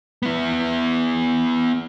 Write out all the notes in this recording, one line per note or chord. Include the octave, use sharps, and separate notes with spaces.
B3 E4